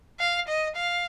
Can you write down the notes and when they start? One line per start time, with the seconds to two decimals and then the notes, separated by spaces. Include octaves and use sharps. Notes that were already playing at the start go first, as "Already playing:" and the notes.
0.20 F5
0.48 D#5
0.76 F5